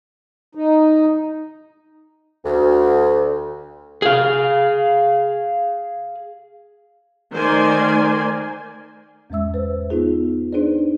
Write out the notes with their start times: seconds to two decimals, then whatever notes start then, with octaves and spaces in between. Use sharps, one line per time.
0.55 D#4
2.44 D2
4.02 G#4 F5
7.35 D#3 A3 A#4 C5 D5 G#5
9.30 E2 G#2 G#3 E5 E6
9.54 B4 C5
9.90 B3 D#4 F4 G#4
10.53 D4 D#4 G#4 B4 C5 D5